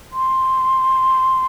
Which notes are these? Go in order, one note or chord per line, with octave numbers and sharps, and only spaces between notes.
C6